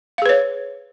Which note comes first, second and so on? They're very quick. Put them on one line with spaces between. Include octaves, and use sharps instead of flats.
F5 G#4 B4 C#5